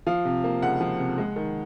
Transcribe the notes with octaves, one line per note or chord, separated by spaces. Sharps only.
F3 F5
C3
A#3
C#2 F#5
F3
C3
G#3
D#3